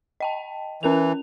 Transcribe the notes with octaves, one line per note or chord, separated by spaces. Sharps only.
D#5 G5 A5
E3 C#4 A#4 F7